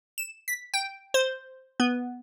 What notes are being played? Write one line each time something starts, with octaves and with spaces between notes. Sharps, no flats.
E7
B6
G5
C5
B3